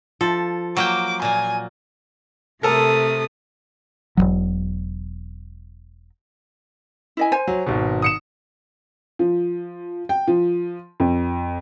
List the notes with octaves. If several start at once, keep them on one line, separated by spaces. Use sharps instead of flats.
F3 A4
F#3 A#3 G5 D6
A#2 A#3 G#5
C3 A3 A4 A#4 D#6
E1 C2 F#3
E4 D#5 G#5
C5 G#5
F#3
G#1 B2
D#6 C#7 E7
F3
G5
F3
F2